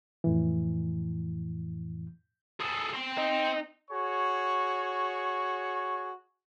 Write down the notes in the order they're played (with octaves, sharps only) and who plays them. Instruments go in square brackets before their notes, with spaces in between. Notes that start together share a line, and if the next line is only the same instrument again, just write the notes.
[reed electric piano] F2 A2 E3
[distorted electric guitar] G#4 A4
C4 C6
[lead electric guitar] D#4
[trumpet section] F#4 G#4 C#5 C#6